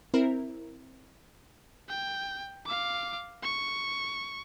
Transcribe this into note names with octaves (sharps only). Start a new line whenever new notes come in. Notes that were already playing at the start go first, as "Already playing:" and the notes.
C4 E4 A#4
G5
F5 D6
C#6